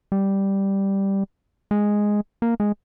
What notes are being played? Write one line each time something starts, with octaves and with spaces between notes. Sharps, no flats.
G3
G#3
A#3
G#3